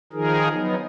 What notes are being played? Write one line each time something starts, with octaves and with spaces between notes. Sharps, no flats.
D#3 F3 D#4 G#4 A#4
F#3 B3 D#4